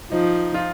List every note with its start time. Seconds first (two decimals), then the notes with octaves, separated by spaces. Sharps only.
0.12 F3 D#4
0.54 F4